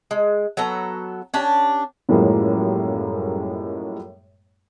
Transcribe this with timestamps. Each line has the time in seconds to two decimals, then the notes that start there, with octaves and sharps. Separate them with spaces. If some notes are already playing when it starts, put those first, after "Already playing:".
0.11 G#3
0.57 F#3 B3 A4 A#5
1.34 C#4 D4 G4
2.09 F#2 A2 F3 G3 G#3 A#3